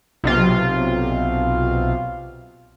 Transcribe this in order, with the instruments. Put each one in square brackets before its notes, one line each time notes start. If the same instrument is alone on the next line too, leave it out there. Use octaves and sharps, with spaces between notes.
[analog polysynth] B1 C3 F4